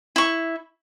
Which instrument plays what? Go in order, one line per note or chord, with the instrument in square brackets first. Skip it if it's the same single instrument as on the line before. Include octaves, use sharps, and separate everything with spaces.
[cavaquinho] E4 C#6